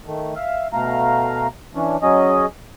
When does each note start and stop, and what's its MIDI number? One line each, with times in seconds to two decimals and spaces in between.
0.06 0.34 51
0.06 0.34 57
0.36 0.67 76
0.36 0.67 77
0.73 1.47 47
0.73 1.47 57
0.73 1.47 77
0.73 1.47 82
1.75 1.96 52
1.75 1.96 61
1.75 1.96 62
2.02 2.46 54
2.02 2.46 61
2.02 2.46 68
2.02 2.46 75